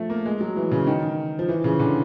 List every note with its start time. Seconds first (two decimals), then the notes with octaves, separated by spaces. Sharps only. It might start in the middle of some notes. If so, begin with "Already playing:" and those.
Already playing: F3 A3
0.10 A#3
0.26 G#3
0.41 F#3
0.56 E3
0.71 C#3
0.87 D#3
1.39 F3
1.48 E3
1.64 C#3
1.79 D3